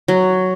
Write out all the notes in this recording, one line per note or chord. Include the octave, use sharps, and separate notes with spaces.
F#3